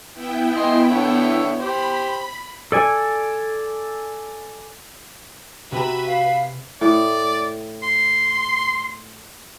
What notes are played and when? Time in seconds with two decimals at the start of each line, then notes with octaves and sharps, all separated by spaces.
0.14 B3 E4 G5
0.57 D#5 G#5 C6
0.91 D3 C#5 E5
1.60 G4 C5 B5
2.72 A4 D5 G#5
5.72 C3 F#4 B4 E5 A#5 B5
6.07 F5
6.81 A2 D5
7.83 C6